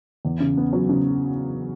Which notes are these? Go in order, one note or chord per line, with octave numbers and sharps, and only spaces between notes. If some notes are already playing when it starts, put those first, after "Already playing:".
E2
C#3
B3
F#3
C#3